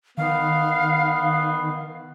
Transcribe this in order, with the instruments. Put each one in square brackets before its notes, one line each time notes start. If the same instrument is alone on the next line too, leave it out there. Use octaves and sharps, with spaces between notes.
[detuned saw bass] D#3 [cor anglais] B3 [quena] F5